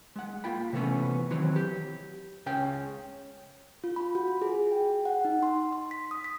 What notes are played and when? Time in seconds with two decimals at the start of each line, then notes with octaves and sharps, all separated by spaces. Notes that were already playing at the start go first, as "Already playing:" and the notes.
0.16 G#3 F#5
0.44 A#3 F4 G5 B5
0.73 C3 E3 A3 B3 C#4
1.30 D#3 E3 F#3 C4 B4 C#5
1.56 G4
2.46 C#2 C#3 C#4 G5
3.84 F4
3.96 B5
4.15 F#4
4.42 G#4
4.72 G5
5.05 F#5
5.25 D#4
5.43 C6
5.73 C6
5.91 B6
6.11 D#6
6.24 B6